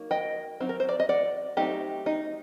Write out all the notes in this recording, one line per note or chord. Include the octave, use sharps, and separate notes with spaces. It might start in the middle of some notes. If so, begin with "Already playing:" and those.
Already playing: F#3 A#3 D#4
D#5 G5
F#3 C4 D#4
A#4
C5
D5
D#5
D5 F#5
F#3 A3 C4 D#4 G4
D#4